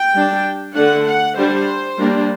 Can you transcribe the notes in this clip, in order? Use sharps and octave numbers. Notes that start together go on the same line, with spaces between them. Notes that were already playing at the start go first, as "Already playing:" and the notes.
Already playing: G5
G3 D4
D3 A3 D4 F#5
F#5
G3 D4 C5
G3 A#3 D4